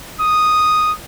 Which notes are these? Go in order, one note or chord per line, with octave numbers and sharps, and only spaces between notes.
D#6